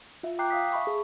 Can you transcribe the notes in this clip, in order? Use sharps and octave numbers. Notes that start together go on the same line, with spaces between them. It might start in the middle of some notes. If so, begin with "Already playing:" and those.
F4 E5
G5 A#5 D6 F#6 G6 C7
F5 D#6 B6
E5 A5 B5 C#6
G#4